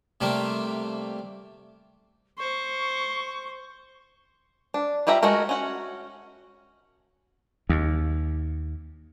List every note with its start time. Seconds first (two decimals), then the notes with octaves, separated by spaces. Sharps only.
0.21 C3 G3 A3 A#3
2.38 C5 C#6
4.74 D4
5.07 G3 F4 G4 E5 A#5
5.23 G#3 A3 F#4 A#4
5.49 C#4 F#4
7.69 D#2